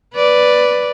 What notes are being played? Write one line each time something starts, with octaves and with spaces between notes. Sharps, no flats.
B4 D5